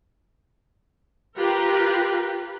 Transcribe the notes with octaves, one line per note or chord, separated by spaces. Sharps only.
F4 G4 A#4 B4